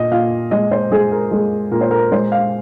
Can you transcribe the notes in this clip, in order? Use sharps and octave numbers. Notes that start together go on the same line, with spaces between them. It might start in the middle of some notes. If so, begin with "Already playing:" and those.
Already playing: A#2 D#5
A#2 F5
G#3 D#5
C5
G#3 G#4
A#4
G#3 G#4
A#2 A#4
C5
A#4
G#3 C5
F5